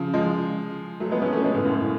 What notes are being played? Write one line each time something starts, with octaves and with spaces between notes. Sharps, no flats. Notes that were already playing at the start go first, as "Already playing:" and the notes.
Already playing: C#3 F3
F3 G#3
F#3 A3
G#3 B3
A3 C#4
A3 C#4
G#3 B3
A2 C#3
F#2 A2